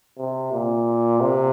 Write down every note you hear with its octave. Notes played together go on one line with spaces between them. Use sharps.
C3
A#2
C3